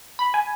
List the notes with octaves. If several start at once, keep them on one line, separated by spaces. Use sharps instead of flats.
B5
G#5